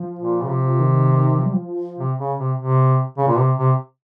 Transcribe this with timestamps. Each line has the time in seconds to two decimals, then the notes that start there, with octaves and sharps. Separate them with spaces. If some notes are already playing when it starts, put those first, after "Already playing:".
Already playing: F3
0.19 A#2
0.42 C#3
0.49 C3
0.79 D#3
1.39 F3
1.45 G3
1.53 F3
1.98 C3
2.19 C#3
2.38 C3
2.58 C3
3.18 C#3
3.27 A#2
3.38 C3
3.58 C3